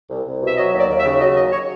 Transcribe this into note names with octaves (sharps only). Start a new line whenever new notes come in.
C2
C2
B2
E5
F#3 D#5
D#2
D5
D#2
E5
C#3
F#3 D#5
D#2 D#5
C#5